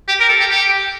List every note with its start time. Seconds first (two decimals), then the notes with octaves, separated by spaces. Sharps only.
0.08 G4
0.20 A#4
0.29 A4
0.40 G4
0.50 G4